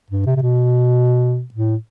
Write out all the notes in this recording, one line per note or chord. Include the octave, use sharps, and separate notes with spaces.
G2
C3
C3
B2
A2